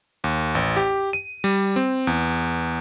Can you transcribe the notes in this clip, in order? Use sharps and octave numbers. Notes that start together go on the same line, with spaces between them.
D#2
A1
G4
D#7
G3
C4
E2